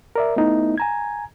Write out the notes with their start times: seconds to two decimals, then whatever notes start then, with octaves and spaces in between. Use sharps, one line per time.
0.16 A#4 D5 E5
0.36 A3 B3 D#4 E4
0.78 G#5 A#5 G#6